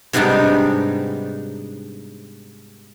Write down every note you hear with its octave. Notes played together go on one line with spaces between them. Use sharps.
G#2 C3 G3 B3 D4 D#4